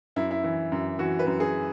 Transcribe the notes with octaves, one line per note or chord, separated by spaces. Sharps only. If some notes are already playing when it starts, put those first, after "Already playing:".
F#2 E4
E4
E3
F#2
E3 F#4
B4
F#2
G#4